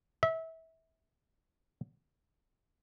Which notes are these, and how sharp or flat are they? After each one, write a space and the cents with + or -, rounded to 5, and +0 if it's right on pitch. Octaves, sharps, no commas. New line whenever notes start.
E5 -25